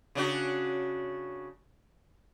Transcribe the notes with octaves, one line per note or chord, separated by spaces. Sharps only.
C#3 D4 F#4